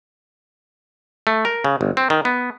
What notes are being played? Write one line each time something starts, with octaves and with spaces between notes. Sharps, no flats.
A3
A#4
C#3
G1
C4
D#3
B3